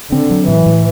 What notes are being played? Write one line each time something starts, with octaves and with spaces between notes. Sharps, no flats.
D3 C4
F#3
A2 E3
A2